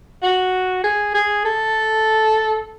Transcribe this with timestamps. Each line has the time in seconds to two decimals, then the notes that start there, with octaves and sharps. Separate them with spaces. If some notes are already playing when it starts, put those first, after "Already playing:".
0.23 F#4
0.84 G#4
1.14 G#4
1.45 A4